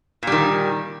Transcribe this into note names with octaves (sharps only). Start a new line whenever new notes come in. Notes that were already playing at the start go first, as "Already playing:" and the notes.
A#2 D#3 G3